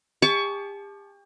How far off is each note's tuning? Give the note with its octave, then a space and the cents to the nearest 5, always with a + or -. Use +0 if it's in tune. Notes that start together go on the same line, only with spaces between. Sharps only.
G4 +40 A5 -30 C#6 +20